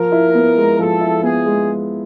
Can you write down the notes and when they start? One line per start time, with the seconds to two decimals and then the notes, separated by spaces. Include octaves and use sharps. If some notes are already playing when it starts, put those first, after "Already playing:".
Already playing: F3 A#4
0.12 E4
0.35 B3
0.57 G#3
0.78 F3 A4
1.01 E4
1.23 B3 G#4
1.46 G#3